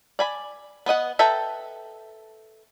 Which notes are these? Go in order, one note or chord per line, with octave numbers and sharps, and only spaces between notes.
D5 G#5 B5
B3 B4 D#5 F#5
A4 B4 E5 G5 A#5